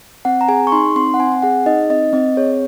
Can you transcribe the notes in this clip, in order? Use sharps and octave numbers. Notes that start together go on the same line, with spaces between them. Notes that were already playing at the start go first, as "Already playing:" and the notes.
C4 F#5
A#5
G#4 G#5
C#6
D#4 C6
C4 C6
F#5
C4 G#5
G#5
G#4 F#5
D#4 D#5
C4 D#5
C4 D#5
G#4 C#5